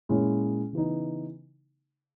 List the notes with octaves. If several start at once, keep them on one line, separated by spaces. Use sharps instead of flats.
A#2 G#3 C#4 E4
C#3 E3 B3 D#4